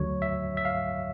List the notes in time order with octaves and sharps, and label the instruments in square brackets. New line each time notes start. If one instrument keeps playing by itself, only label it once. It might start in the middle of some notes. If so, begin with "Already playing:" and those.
Already playing: [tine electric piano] D2 D3 F#3 C#5
E5
E5
F5